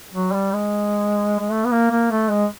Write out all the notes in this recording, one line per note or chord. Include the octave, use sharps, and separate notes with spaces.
F#3
G3
G#3
G#3
A3
B3
A#3
A#3
A3
G#3